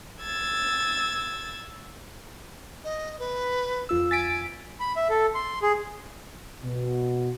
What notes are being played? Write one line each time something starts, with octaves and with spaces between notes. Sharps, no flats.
E6 G#6 A6
D#5
B4
F2 F4 E6
G#5 A6 B6 D7
B5
E5
A4
C6
G#4
B2